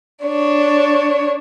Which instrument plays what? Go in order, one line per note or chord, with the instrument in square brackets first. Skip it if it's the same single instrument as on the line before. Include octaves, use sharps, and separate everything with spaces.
[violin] D4 C#5